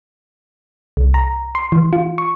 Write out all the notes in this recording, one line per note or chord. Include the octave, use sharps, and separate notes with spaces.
C2
A#5
C6
E3
F4
C#6